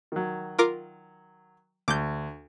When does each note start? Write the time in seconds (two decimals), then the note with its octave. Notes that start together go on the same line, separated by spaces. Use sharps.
0.12 D#3 F#3
0.59 F4 A#4 D6
1.88 D2 D6 G6